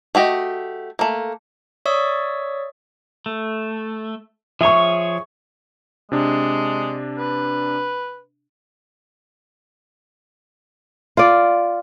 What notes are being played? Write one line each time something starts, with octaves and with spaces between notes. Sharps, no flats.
A3 F#4 G4 D#5
A3 A#3
C#5 D5 E5 C#6 D#6 E6
A3
F3 G#4 C#5 E5 C#6
C3 G#3 D4
B4
F4 D5